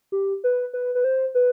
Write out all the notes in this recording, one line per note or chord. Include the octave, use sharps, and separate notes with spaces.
G4
B4
B4
B4
C5
B4